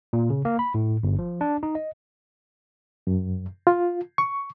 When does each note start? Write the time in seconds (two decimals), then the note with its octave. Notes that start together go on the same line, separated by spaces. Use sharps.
0.13 A#2
0.30 C#3
0.45 A#3
0.59 B5
0.74 A2
1.03 G1
1.19 F3
1.41 D4
1.63 D#4
1.75 D#5
3.07 F#2
3.67 F4
4.18 C#6